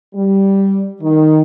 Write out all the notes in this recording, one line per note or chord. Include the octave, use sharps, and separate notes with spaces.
G3
D#3